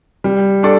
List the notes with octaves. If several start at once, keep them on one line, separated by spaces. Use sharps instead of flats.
G3
D4 A4 D5